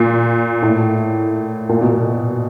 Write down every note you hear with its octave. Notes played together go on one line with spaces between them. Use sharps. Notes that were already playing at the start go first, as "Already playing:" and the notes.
Already playing: A#2
A2
A#2
B2
A#2